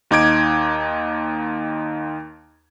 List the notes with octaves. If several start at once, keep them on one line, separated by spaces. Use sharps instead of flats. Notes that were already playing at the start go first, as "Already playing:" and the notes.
D#2 D#4 D6 G#6 D7